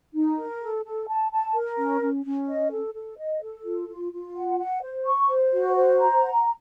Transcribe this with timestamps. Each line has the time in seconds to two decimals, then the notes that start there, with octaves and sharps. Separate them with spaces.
0.14 D#4
0.38 A#4
0.61 A4
0.85 A4
1.09 A5
1.32 A5
1.54 A#4
1.79 C#4
2.01 C#4
2.25 C#4
2.48 D#5
2.71 A4
2.94 A4
3.18 D#5
3.42 A4
3.65 F4
3.88 F4
4.12 F4
4.35 F#5
4.59 F#5
4.83 C5
5.05 C#6
5.29 C5
5.53 F#4
5.75 C5
5.99 A#5
6.22 F#5